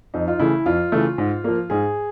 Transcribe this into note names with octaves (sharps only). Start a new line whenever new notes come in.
F2 D#4
F4
C#3 E3 A3 E4
F2 F4
C#3 E3 A3
G#2
F3 A#3
G#2 G#4